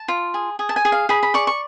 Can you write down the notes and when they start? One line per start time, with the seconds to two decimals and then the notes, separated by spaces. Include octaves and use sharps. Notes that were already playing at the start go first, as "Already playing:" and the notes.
Already playing: A5
0.08 F4
0.34 G#4
0.59 G#4
0.69 A5
0.76 G#5
0.85 G#4
0.92 F5
1.09 G#4 B5
1.23 B5
1.34 D5 C#6
1.47 C#6